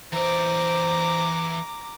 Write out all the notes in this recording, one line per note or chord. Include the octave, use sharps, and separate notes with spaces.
E3 C5 D5 A#5 D6